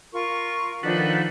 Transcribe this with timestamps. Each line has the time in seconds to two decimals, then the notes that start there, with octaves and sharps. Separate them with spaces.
0.13 F4 A#4 C#6
0.83 D#3 F3 D4 D#4 A4 B4 F#5